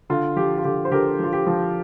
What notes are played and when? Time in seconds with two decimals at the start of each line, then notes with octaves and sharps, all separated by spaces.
0.10 D3 F4
0.36 F3 G4
0.58 F4
0.64 D3 G4
0.85 C5
0.91 D3 G4 A#4
1.19 F3 F4
1.33 G4
1.47 F3